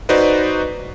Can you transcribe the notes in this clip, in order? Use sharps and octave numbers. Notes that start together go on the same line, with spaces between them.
D#4 F#4 B4 C5 D5 D#5